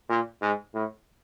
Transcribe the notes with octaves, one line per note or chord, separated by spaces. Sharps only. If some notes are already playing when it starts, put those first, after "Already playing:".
A#2
G#2
A2